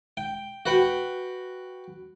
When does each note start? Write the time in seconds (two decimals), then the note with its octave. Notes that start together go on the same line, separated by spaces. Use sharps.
0.17 G5
0.66 F#4 B4 G5